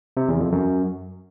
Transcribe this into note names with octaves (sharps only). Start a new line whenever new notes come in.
C3
E2
F2
F#2